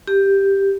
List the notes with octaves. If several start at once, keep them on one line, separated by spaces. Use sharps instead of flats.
G4